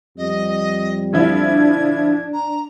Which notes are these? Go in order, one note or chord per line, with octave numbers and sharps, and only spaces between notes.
F2 G3 D#5
D3 F3 D4 E4 G#6
A#5